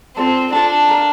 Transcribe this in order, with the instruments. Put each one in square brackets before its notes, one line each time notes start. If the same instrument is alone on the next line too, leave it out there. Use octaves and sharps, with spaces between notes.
[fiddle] C4 [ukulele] F4 A4 D5 A5
[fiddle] D4 [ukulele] F4 A4 D5 A5
[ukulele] A#4 F5 A#5